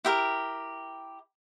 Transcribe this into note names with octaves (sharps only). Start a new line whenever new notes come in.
E4 G4 A#4